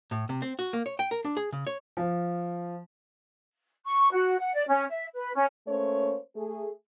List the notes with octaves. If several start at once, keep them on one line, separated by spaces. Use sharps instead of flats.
A2
C3
C4
F#4
A#3
C#5
G5
A#4
D4
G#4
C#3
C#5
F3
C#6
F#4
F#5
D5
C#4
E5
B4
C#4
A3 A#3 C#4 C5 C#5
A3 G#4